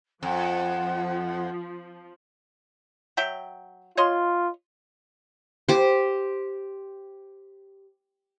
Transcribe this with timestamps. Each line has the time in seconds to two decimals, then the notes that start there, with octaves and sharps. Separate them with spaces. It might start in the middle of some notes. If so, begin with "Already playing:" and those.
0.23 F2 F3 F#5
3.17 F#3 E5 G5
3.97 F4 C#5 D#5 C6
5.69 G4 C5